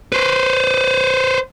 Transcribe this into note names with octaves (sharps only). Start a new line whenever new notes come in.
B4 C5